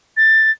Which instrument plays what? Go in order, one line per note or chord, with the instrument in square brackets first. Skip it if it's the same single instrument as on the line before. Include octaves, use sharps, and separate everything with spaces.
[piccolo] A6